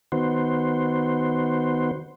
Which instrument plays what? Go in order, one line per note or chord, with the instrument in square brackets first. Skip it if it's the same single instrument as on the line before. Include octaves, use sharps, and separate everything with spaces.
[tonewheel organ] D#3 B3 F#4 C5